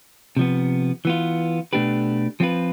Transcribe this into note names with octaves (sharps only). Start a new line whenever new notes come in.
C3 F3 B3
E3 B3 F4
B2 A3 D4 G4 B4
F3 C4 F4 B4